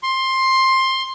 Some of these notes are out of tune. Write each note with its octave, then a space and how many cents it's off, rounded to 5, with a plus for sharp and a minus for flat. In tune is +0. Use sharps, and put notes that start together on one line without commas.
C6 +15